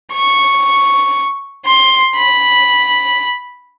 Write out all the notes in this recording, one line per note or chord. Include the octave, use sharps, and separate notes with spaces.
C#6
C6
B5